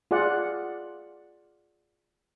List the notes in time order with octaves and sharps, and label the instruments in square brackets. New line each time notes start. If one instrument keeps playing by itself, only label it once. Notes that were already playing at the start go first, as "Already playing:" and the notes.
[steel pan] F4 G#4 D5 F#5